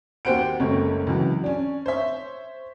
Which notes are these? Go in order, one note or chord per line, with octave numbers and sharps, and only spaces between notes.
D#2 F#4 G4 C5 F#5 D7
F#1 C#2 A3 C#5
C#2 E3 F#3
C#4 D4
C5 C#5 E5